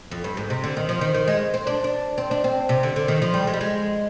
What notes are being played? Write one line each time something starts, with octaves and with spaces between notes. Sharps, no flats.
F2
G2
G#2
C3
D3
D#3
F3
D#3
D#3
G#3
C4
D4
D4
C4
D4
C4
C3
D3
D3
D#3
F3
G3
G#3
G3
G#3